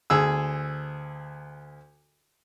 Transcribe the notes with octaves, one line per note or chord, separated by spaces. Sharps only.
D2 G#4 E6